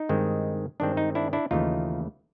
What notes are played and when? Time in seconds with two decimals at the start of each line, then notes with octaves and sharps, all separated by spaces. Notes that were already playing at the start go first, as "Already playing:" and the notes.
Already playing: D#4
0.09 G2 D#3 G#3 C4
0.80 G2 D#3 G#3 C4 D4
0.97 D#4
1.15 D4 E4
1.33 D4 E4
1.51 D#2 C#3 E3 A3 D#4 F4